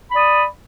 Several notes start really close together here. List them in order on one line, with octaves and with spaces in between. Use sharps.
B5 D5 D#6